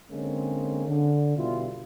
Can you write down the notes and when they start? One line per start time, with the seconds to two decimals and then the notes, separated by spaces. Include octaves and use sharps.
0.10 D3 G#3 A#3 C4 C#4
0.88 D3
1.36 B2 G3 E4 F4